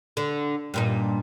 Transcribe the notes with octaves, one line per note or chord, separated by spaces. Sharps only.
D3
G2 A#2 D#4